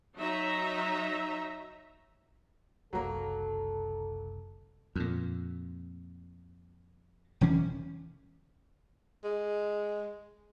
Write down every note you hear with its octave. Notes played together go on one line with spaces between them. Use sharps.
F#3 D#4 E5 A#5
F#1 C2 F#3 A#3 A4
F2 A#2
E1 E3 C#4
G#3